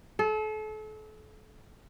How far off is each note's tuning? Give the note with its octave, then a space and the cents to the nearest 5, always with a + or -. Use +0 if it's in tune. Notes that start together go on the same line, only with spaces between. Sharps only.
A4 -35